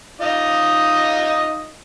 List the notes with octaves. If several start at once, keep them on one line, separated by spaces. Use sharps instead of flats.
D#4 F4 D#5